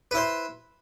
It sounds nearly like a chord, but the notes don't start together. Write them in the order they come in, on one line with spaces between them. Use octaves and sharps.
B4 E4 C5